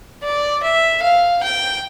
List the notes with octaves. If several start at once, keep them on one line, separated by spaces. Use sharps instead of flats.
D5
E5
F5
G5